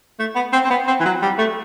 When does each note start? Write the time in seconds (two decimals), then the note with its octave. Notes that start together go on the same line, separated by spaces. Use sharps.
0.19 A3
0.35 B3
0.52 C4
0.64 C4
0.70 B3
0.87 C4
1.00 E3
1.05 F#3
1.22 G3
1.38 A3